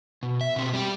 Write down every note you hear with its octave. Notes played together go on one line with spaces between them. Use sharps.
B2
E5
B2 C4
G3 G4